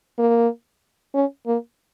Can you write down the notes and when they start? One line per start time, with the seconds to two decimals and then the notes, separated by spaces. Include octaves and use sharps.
0.19 A#3
1.15 C#4
1.47 A#3